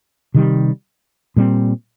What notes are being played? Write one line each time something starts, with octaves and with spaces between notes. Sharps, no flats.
C3 D#3 G3
A#2 G3 C4